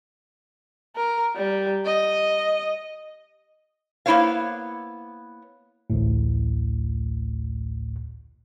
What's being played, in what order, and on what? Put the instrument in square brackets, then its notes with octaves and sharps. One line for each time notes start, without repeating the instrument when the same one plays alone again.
[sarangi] A#4
G3
D#5
[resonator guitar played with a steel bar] A#3 B3 E4 C5 C#5 F5
[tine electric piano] A1 D2 A2